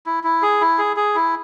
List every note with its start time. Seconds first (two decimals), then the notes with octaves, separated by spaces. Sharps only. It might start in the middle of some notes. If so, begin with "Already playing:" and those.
0.06 E4
0.24 E4
0.42 G#4
0.61 E4
0.78 G#4
0.97 G#4
1.15 E4